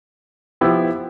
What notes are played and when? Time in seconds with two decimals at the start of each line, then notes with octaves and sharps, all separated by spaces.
0.61 F3 B3 E4 G4